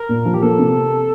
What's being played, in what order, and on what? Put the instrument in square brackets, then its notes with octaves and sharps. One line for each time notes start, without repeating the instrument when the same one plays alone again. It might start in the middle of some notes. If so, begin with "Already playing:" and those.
Already playing: [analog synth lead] A#4
[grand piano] A#2
F3
[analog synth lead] G4
[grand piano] A#3 [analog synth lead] A4
[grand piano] C3